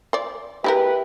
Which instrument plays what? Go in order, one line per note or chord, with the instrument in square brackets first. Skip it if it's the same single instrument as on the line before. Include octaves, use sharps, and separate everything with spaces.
[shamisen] C5 D5
[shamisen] G#3 E4 A#4 [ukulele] G4 [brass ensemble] B4 E5